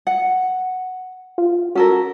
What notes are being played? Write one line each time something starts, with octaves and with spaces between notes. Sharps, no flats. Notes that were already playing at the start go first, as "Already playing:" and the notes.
F#5
F4
C#4 F#4 A4 A#4